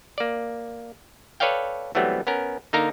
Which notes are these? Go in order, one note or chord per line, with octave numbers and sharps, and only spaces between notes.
A#3 D5
A4 B4 C#5 D5 F5 G5
E3 F#3 G3 A3 B3 C4
B3 C#4 A#4
D3 A#3 D#4 A#4 A#5